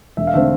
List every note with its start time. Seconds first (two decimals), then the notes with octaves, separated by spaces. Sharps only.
0.17 E1 E5
0.27 F5
0.34 D3 A3 C4 E5